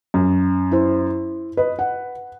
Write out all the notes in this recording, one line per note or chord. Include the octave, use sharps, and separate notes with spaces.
F#2
E4 C5
B4 D#5
F#5